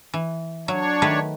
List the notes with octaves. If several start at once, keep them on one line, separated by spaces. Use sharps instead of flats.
E3
F#3 D4 C#5
D#3 A3 B4